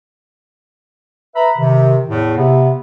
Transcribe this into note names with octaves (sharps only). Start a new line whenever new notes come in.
B4 E5 A#5 B5
C3 D#3
E2 A2
C3 B3